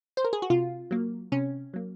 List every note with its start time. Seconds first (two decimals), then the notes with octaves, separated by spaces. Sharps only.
0.17 C5
0.25 A#4
0.33 G#4
0.42 F#4
0.50 C3 F4
0.91 F#3 A#3
1.32 C3 C#4
1.74 F#3 A#3